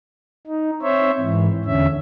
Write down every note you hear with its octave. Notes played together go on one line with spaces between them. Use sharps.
D#4
C4 C5 C#5 E5
G#2 E3
E2 D3 C#4 E5